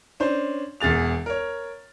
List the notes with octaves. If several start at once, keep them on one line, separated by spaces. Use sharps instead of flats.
C#4 D4 C5
E1 E2 G#4 A6 F7
A#4 C#5